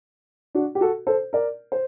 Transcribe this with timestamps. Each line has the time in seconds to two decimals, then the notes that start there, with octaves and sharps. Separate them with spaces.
0.55 D4 F#4
0.75 G4
0.81 F#4 A4
1.07 A4 C5
1.33 A#4 D5
1.72 C5